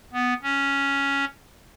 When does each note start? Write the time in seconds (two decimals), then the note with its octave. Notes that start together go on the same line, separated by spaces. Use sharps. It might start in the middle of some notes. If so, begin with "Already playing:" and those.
0.13 B3
0.42 C#4